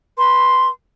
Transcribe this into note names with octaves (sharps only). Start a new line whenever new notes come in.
B4 C6